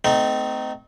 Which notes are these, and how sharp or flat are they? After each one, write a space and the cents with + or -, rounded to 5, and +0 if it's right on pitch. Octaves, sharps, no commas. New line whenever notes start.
A3 +0 C4 -30 D#4 -5